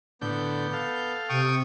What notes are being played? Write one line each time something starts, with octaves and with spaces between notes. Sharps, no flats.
A2 D3 B3 G6
A4 F5
C3 G5 C#6 D#6